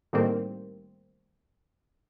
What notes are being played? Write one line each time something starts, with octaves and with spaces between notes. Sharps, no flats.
A2 D#3 G3 A#3 C4